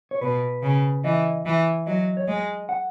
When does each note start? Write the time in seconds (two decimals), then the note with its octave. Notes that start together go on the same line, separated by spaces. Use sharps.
0.11 C#5
0.21 B2 B4
0.63 C#3
1.04 E3 D#5
1.46 E3 E5
1.87 F#3 D#5
2.17 C#5
2.28 G#3 D#5
2.69 F#5